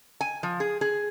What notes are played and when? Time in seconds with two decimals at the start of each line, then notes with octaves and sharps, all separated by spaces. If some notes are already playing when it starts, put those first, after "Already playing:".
0.21 G#5
0.43 F3
0.60 G#4
0.81 G#4